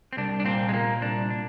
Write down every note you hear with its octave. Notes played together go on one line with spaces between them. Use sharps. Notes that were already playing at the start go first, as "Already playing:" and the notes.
C4
C2 D4
D4
A#2 C4
G#3
A#2 A#3
C2 D4
D4